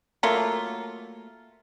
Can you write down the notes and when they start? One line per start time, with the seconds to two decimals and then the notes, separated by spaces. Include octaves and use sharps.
0.23 F#3 A3 A#3 F4